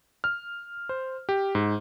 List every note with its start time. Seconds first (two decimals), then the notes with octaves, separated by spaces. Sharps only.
0.24 F6
0.89 C5
1.29 G4
1.55 G#2